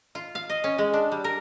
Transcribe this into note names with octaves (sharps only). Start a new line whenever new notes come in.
F4
F5
D#5
C#4
G#3
D4
G3
A#4